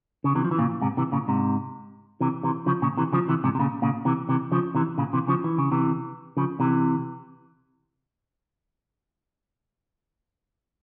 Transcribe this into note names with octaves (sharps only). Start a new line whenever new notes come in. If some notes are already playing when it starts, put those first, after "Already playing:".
C#3
C3 E3
F3
E3
A#2 C#3
G#2 C3
C3 E3
A#2 C#3
G#2 C3
C3 E3
C3 E3
C#3 F3
A#2 C#3
C3 E3
C#3 F3
C3 E3
G#2 C3
C3
A#2 C#3
A#2 C#3
C3 E3
C3 E3
C#3 F3
C3 E3
A#2 C#3
C3 E3
C#3 F3
E3
C#3
C3 E3
C#3 F3
C3 E3